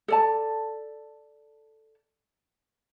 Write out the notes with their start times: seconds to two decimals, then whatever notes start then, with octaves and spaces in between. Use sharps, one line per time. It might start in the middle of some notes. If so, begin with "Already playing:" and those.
0.08 A4 D5 A5